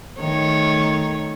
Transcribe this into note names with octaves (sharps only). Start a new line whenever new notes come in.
D#3 A3 C#5